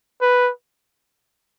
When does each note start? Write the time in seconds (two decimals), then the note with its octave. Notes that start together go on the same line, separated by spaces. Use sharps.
0.21 B4